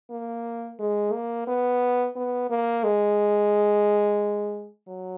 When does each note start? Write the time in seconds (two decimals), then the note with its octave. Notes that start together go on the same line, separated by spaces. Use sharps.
0.11 A#3
0.80 G#3
1.13 A#3
1.47 B3
2.16 B3
2.50 A#3
2.84 G#3
4.88 F#3